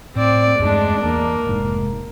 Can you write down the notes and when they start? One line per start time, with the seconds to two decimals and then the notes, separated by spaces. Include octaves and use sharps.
0.16 A2 C4 D5
0.59 E2 G2 G#3 A3 D4
1.04 E2 A#3
1.47 F1 G#2